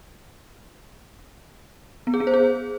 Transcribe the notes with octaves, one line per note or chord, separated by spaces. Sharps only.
B3
G#4
B3
C5
G#4